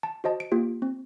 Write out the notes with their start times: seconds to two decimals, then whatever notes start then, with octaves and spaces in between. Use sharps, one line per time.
0.03 A5
0.24 F#4 C5 D#5 A5
0.40 D7
0.52 A#3 F4 G4
0.82 C4